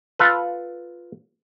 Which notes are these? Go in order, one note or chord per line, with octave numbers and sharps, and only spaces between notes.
F4 A4 B4